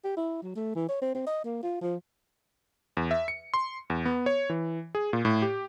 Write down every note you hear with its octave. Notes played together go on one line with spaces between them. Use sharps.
G4
E4
F#3
A3
E3
C#5
C4
C4
D#5
A#3
F4
F3
E2
E5
C#7
C6
E2
B3
C#5
E3
G#4
A#2
A2
G4